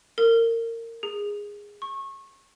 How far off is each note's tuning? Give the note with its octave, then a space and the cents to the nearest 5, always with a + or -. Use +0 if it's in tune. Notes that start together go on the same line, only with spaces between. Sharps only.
A#4 -25
G#4 -15
C#6 -25